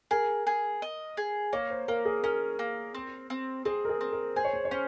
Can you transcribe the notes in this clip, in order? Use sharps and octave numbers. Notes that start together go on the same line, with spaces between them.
G#4 A#4
G#4
D#5
G#4
A#3 C#5
C5
A#3 A#4
G#4
C#4 A#4
A#3
C4
C4
C4 G#4
A#4
G#4
C4
A#4
G#4 C5
C#5
C5
C#5
C#4 C5